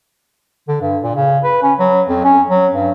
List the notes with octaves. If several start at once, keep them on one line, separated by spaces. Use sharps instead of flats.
D3
G2
A#2
C#3
B4
C#4
F#3
F2
C#4
F#3
G2